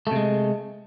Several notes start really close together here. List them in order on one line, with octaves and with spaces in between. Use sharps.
A3 C3 G#3